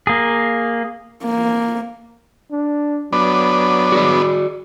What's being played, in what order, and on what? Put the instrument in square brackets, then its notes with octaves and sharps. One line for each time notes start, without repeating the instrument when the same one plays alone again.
[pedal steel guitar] A#3 G#4
[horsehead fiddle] A#3
[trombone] D4
[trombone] F#3 [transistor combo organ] B3 D4
[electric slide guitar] F#4 G#4 D5